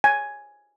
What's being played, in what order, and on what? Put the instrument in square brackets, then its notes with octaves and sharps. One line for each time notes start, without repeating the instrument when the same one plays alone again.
[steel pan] G#5